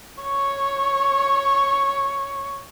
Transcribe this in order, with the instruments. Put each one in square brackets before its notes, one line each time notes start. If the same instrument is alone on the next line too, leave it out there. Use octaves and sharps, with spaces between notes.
[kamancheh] C#5 C#6